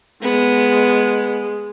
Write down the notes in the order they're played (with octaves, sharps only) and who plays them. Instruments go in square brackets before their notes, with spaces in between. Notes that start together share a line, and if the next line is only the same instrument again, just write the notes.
[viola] G#3 [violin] B3